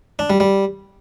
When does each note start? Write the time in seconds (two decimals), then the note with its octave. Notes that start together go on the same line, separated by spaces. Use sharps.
0.19 D4
0.30 G3
0.40 G3